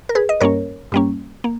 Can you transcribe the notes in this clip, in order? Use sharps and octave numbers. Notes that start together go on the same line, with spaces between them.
A#4
G#4 B4
D#5
G2 G3 A#3 C#4 A#4 C#5
G2 G3 A#3 C#4
A#3